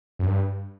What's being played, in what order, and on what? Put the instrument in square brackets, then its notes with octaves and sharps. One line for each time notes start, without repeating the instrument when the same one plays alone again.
[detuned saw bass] F#2
G2